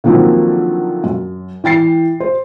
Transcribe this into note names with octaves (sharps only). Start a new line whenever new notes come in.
D3 D#3 F3 F#3 A#3 C4
F#2
E3 G5 A6 C7
C5